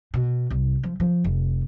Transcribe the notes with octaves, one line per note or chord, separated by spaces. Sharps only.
B2
C2
F3
F3
F1